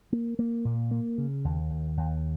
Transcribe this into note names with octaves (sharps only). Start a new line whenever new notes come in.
A#3
A#3
A#2
A#3
C#3
D#2
D#2
D#2